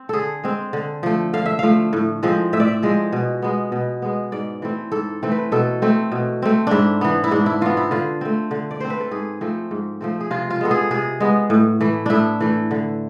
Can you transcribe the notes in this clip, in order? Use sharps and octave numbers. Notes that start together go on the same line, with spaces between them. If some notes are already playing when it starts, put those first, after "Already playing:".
Already playing: C4
D3 G#4 A4
G#3 C4
D3
F3 A3
D3 F5
E5
F3 A3 F5
A2
F3 G#3 C4
A2 E5
D5
E5
F3 G#3 C4
B2
G#3 B3
B2
G#3 B3
G#2 D5
E3 A3 C4
G#2 A4
E3 A3 C4
B4
B2 A4
A3 C4
B2
A3 C4
G#2 D4 E4
E3 B3
E4
G#2 D4
E4
E3 B3 F4
E4
D3 F4
A3 C4
D3
D5
A3 C4 C5
B4
A4
G#2 G#4
F3 A3 C4
G#2
F3 A3 C4
G#4
C3 F4
F4
G#3 B3 A4
G#4
C3 G#4
G#3 B3
A2
E3 A3
A2 D4 E4
E3 A3
D3